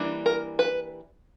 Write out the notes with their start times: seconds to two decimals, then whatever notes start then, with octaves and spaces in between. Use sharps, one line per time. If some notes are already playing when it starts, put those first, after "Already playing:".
Already playing: E3 G3 A#3 D4
0.26 A#4
0.59 B4